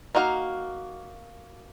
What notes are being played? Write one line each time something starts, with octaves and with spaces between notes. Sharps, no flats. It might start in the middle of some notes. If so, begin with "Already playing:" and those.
A#3 D#4 F#4 F5